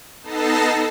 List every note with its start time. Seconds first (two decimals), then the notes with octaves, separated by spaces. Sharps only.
0.23 B3 D#4 A4 A5 A#6 C7